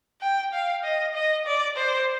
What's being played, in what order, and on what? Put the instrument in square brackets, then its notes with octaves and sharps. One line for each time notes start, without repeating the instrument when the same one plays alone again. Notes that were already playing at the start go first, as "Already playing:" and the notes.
[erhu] G5
F5
D#5
D#5
D5
C5